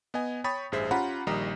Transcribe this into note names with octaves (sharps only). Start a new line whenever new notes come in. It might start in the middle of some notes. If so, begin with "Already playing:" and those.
B3 D#5 G#5
C#5 G5 B5 C#6 D#6 A6
A1 G2 G#4 C5 E5 B6
C#4 F4 G4 F#5 A#5 B5
A#1 D#3 G3 D#5 A#5 D#6